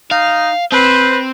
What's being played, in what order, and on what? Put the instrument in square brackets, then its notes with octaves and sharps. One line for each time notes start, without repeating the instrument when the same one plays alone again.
[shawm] D#4 [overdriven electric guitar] F5
[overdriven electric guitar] C4 [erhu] B4 [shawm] C5